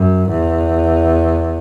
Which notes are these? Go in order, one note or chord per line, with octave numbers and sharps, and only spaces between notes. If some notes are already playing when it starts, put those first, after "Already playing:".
Already playing: F#2
E2